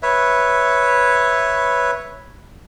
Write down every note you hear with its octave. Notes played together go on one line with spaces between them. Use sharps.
B4 C#5 E5